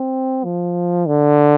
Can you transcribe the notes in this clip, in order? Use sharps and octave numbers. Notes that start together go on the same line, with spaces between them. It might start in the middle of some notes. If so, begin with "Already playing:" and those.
Already playing: C4
F3
D3